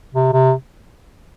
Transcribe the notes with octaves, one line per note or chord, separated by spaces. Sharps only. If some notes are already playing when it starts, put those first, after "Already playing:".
C3
C3